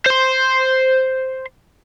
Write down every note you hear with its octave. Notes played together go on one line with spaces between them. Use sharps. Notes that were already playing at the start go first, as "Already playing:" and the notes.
C5 C6